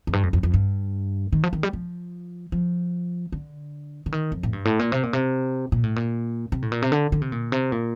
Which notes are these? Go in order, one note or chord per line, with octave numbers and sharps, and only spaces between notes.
F2
G2
F2
F2
F2
G2
D#3
F3
D#3
G3
F3
F3
D3
D3
D#3
F2
A2
G2
A2
A#2
C3
A#2
C3
A#2
A2
A#2
C3
A2
A#2
C3
D3
D3
C3
A#2
C3
A#2